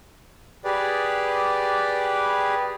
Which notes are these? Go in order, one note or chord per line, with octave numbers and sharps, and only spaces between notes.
G4 G#4 B4 D5